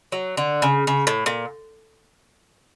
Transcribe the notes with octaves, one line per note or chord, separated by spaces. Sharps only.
F#3
D3
C#3
C#3
A2
A#2